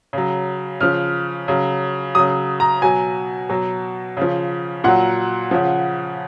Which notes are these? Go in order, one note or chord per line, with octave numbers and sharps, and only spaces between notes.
C#3 F#3
C#3 F3 F6
C#3 F#3
C#3 F#3 D#6
A#5
B2 F#3 G#5
B2 F#3
C#3 F3
A#2 F#3 F#5
C#3 F3